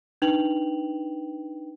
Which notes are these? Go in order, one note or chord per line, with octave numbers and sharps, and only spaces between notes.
D4 D#4 B4 G5 F7 F#7